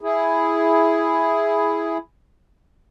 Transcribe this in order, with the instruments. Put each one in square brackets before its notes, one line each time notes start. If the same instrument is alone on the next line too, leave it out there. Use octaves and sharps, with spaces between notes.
[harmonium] E4 G#4